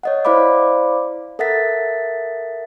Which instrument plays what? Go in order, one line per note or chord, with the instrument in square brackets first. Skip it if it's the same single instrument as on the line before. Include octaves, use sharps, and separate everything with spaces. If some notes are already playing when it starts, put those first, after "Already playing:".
[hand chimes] C#5 D#5 F#5
E4 C5 D5 F5 B5 D6
A4 A#4 E5 F#5 A6 B6